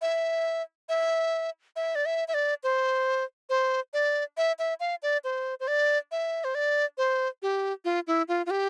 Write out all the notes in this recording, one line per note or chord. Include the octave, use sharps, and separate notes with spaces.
E5
E5
E5
D5
E5
E5
D5
C5
C5
D5
E5
E5
F5
D5
C5
C5
D5
E5
C5
D5
C5
G4
F4
E4
F4
F4
G4